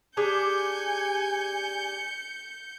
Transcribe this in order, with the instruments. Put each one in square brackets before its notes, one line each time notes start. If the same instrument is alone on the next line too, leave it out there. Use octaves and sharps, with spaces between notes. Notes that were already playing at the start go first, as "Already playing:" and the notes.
[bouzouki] D4 G4 G#4 [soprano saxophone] G#5 [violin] G6 C#7